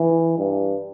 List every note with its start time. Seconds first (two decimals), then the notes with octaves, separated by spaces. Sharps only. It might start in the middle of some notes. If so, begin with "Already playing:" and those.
Already playing: E3
0.38 G2